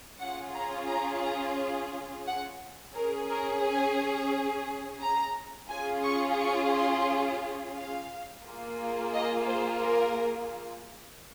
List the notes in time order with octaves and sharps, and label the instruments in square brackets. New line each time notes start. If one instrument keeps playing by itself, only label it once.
[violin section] C#4 F4 G#4 F#5
A#5
A#5
A#5
F#5
C#4 G#4 A#4
A#4
G#5
A#5
C#4 F4 G#4 G#5
C#6
C#6
C6
F5
A#3 F4 G#4
D#5
C5
A#4